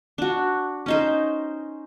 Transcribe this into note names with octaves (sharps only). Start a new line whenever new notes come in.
D4 F#4
C#4 D#4 C5